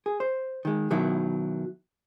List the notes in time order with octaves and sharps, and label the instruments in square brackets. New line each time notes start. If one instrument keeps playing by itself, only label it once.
[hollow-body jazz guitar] G#4
C5
D#3 G#3
B2 D#3 F#3 E4